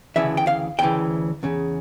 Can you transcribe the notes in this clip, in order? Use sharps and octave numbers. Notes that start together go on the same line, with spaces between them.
D2 C#3 E3 E5
G5
F5
D2 C#3 E3 G5
E2 C#3